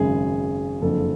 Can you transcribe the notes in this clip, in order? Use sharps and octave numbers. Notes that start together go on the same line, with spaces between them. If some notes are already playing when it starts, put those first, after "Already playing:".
Already playing: G#1 F#2 C#3 G#4
F#1 F2 D3 A4